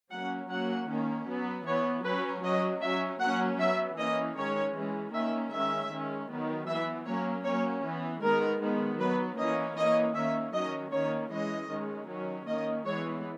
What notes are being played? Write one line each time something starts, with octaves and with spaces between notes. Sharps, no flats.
F#3 A#3 C#4 F#5
F#3 A#3 C#4 F#5
D#3 A#3 C#4
F#3 B3
E3 B3 C#5
F#3 C#4 B4
F#3 C#4 D#5
F#3 C#4 E5
F#3 A#3 C#4 F#5
F#3 B3 E5
E3 A#3 C#4 D#5
D#3 G#3 C#4 C#5
E3 G#3 C#4
D#3 A#3 C#4 E5
D#3 G#3 C#4 E5
D#3 G#3 C#4
D#3 F#3 B3
E3 B3 E5
F#3 A#3 C#4 C#5
F#3 A#3 C#4 C#5
E3 B3
D#3 G#3 B3 A#4
D#3 G#3 B3
F#3 B3 B4
E3 A#3 C#4 D#5
E3 A#3 C#4 D#5
D#3 A#3 C#4 E5
D#3 F#3 C#4 D#5
D#3 A#3 C#4 C#5
E3 G#3 C#4 D#5
D#3 G#3 C#4
D#3 F#3 C#4
D#3 A#3 C#4 D#5
E3 G#3 B3 C#5